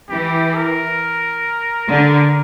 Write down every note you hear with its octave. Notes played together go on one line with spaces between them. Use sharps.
E3 G4
A#4
D3